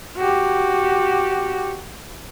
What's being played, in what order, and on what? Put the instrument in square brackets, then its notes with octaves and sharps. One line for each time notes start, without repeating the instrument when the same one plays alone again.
[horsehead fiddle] F#4 G4